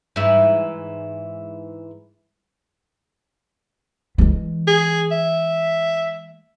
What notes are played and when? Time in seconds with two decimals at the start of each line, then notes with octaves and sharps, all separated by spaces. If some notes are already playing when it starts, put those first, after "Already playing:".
0.16 G#2 E3 E4
4.18 E3 G#3
4.67 G#4
5.11 E5